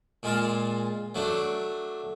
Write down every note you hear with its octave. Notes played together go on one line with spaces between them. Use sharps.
A#2 G#3 F4 A5
F#3 A3 D4